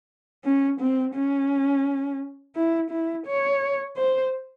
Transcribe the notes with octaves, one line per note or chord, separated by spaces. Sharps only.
C#4
C4
C#4
E4
E4
C#5
C5